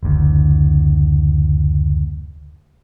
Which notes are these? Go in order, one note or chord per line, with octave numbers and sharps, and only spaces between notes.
F#1 D2